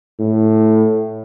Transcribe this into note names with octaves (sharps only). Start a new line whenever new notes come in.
A2